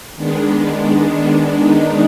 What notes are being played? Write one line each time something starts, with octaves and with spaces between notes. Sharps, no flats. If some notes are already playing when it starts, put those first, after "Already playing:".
D#3 G#3 B3 D4
D#4